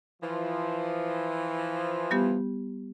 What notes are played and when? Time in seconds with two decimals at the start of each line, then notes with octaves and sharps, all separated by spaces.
0.22 E3 F3
2.11 G3 B3 G4